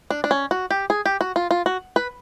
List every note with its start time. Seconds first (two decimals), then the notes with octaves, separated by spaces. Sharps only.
0.10 D4
0.24 D4
0.31 C#4
0.51 F#4
0.70 G4
0.90 G#4
1.05 G4
1.21 F#4
1.36 F4
1.51 F4
1.66 F#4
1.96 B4